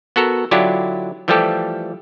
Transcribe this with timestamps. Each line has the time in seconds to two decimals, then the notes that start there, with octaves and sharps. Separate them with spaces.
0.16 B3 F#4 A4 A#4
0.51 D3 F#3 D4 E4 F4 G4
1.28 E3 F3 G3 A3 G4 A4